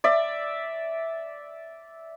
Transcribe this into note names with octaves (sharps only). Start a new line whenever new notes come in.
D5 E5